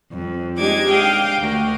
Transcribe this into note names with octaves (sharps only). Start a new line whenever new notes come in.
F2
G#3 D4 D#4 G4 D6 G#6
F5 G5 D6 D#6
D2 F#4 A#4